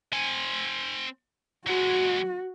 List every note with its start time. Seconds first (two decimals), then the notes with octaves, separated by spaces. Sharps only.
0.13 C4 G#5
1.67 F#3 G#3 F#4